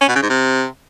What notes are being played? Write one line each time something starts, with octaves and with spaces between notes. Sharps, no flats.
C#4
B2
C#3
G#2
C3